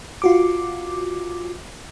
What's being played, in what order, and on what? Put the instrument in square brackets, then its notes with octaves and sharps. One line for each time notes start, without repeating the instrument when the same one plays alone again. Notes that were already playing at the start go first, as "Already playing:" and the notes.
[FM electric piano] F4 F#4 D6